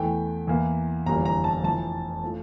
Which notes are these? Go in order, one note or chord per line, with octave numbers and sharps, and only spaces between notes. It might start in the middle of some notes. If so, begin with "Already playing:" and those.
Already playing: E2 E3 A3 G5
E2 E3 A#3
G1 F2 E3 G3 A#3 A#5
A#5
A5
F1 F2 E3 A5
F3 A3